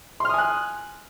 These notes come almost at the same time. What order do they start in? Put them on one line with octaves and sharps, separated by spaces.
C6 F6 D#6 G#5 F#6